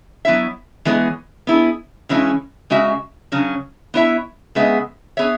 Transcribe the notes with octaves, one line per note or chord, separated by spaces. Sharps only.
F#3 B3 E4 C#5 E5
E3 G#3 B3 G#4 C#5
B3 E4 G#4
C#3 E3 G#3 C#4 E4
C#3 G#3 C#4 F#4 E5
C#3 F#3 C#4
B3 E4 C#5 E5
C#3 G#3 B3 G#4 E5
B3 G#4 C#5 E5